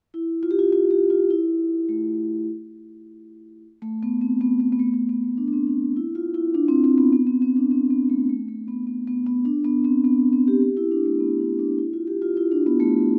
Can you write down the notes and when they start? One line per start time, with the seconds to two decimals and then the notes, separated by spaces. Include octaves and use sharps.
0.14 E4
0.43 F4
0.51 G4
0.59 F4
0.73 F4
0.91 G4
1.10 F4
1.30 E4
1.89 A3
3.82 A3
4.03 B3
4.21 C4
4.41 B3
4.60 B3
4.73 B3
4.79 A3
4.94 B3
5.09 B3
5.23 A3
5.38 D4
5.48 D4
5.53 C4
5.67 D4
5.97 E4
6.15 F4
6.34 E4
6.54 D4
6.69 C4
6.84 C4
6.98 B3
7.13 B3
7.27 C4
7.42 C4
7.56 D4
7.71 C4
7.90 B3
8.10 A3
8.29 A3
8.48 A3
8.68 B3
8.87 B3
9.07 B3
9.26 B3
9.45 D4
9.64 B3
9.85 C4
10.04 B3
10.33 C4
10.48 G4
10.62 G4
10.77 E4
10.92 D4
11.06 A3
11.20 B3
11.40 D4
11.59 D4
11.78 E4
11.93 F4
12.07 G4
12.22 F4
12.37 E4
12.52 D4
12.67 B3
12.80 A3